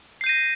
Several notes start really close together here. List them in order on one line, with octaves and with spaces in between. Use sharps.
C7 G6 D#7 A#6